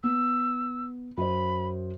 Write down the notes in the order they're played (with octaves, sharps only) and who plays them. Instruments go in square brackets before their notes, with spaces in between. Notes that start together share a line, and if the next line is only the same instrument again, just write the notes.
[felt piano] B3 [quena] E6
[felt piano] F#2 C5 [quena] B5